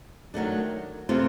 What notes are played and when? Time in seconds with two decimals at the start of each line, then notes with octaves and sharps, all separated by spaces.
0.34 D#3 F#3 A3 D4
1.09 C3 E3 A3 C4 F4